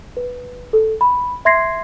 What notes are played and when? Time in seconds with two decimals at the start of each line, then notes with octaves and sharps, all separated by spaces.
0.17 B4
0.73 A4
1.01 B5
1.45 E5 C6 G#6 A#6 C7